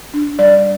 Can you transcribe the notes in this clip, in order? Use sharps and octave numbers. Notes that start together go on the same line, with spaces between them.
D4
G3 D5